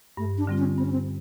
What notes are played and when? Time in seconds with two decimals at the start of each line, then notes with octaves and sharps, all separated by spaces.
0.17 G2 A3
0.38 D4
0.47 D3 G3 C4 F4
0.58 C#4
0.77 G2 C4
0.85 C#4
0.92 C4